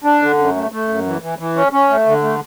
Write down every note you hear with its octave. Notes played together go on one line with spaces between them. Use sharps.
D4
D3
F#2
A3
A3
F#2
E3
E3
E3
C#4
C#4
A3
D3
A3